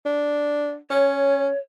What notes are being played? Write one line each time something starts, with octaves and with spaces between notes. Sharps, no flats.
D4
C#4 C#5